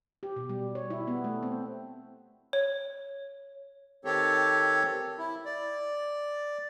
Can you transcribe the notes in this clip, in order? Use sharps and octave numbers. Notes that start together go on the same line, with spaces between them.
G4
B2
G3
C#5
E4
B3
A3
C4
C#5
D#3 C4 G4 A4 C#5
E4
D5